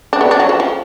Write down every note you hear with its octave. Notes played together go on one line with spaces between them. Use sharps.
D4
B3
D4
F#3
F3
F3